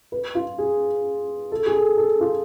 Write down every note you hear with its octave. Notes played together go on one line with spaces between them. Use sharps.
B4
F4
G#4
A4
G#4
A4
A4
F4